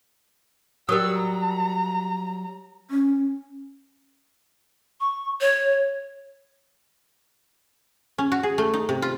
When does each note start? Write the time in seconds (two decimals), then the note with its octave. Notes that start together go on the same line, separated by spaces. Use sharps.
0.89 F#3 G3 A#4 D#6 E6
1.18 A#5
2.90 C#4
5.01 C#6
5.41 C#5
8.18 C#4
8.32 F#4
8.43 G#4
8.58 A3
8.74 D#4
8.89 C3
9.02 F4